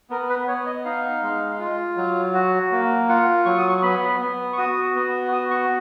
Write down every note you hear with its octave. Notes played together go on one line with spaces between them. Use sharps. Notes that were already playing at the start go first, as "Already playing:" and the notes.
B3 A#4
B4
B3 C#5
D#5
D#4 F5
G#3
F4
F#3
F#4
A#3
F4 F#5
F#3 C#6
D#6
C#6
B3 B5
B3
C#6
F#4 D#6
B3
F#4 D#6
C#6